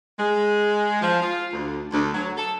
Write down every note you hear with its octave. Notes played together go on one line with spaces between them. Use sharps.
G#3
F3
F4
D2
D2
F#3
A4